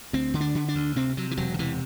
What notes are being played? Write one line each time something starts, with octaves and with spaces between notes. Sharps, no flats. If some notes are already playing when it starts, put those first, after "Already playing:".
D2 C4
D3
D4
D3
D4
D2
C3 C4
C3 F#3
E3
E1 F#3
D3
C3 E3